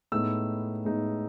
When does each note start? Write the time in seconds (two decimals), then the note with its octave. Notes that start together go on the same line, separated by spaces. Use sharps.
0.12 A2 G#3 B3 D#4 E6
0.85 A2 G#3 B3 D#4